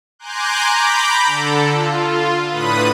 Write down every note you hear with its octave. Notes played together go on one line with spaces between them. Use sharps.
G#5 A#5 C6 D6 F#6 G6
A#5 B5 D6 G6
D3 A4
F4
A2 D3 B4 B5 D#6 D#7